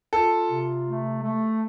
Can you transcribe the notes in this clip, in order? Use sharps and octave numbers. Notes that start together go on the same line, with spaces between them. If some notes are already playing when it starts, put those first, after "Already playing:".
F4 A4
C3
A3
A3